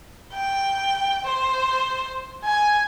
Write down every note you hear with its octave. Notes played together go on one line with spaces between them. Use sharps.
G5
C5
G#5